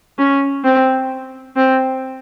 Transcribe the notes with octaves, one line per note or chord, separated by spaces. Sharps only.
C#4
C4
C4